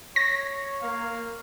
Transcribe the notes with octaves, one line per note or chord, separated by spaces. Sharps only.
C#5 A#6
A#3 F5